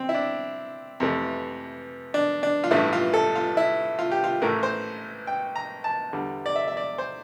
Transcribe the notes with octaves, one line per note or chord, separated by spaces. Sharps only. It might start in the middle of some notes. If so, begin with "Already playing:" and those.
Already playing: C4
E4
D4
F2 C3 E3 A3
D4
D4
F4
A1 G2 E3 A3 E4
F4
A4
F4
E4
F4
G4
F4
A1 A2 E3 A3 A#4
C5
G5
A#5
A5
E2 D3 G3
D5
E5
E5
D5
C5